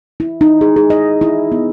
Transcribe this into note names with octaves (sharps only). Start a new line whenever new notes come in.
E4
D#4
G#4
G#4
D#5
E4
B3